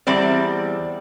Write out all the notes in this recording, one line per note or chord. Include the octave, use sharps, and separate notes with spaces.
E2 G3 C4 D5